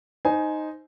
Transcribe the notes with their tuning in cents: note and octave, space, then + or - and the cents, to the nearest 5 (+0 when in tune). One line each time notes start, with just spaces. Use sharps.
D#4 +0 C5 +0 G#5 +15